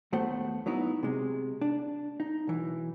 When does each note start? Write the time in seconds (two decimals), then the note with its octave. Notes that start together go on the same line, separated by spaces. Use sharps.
0.12 D#2 A3 B3 C5 F#5
0.66 F#3 B3 D#4 E4
1.03 C3 G#3
1.62 D4
2.20 D#4
2.47 B1 E3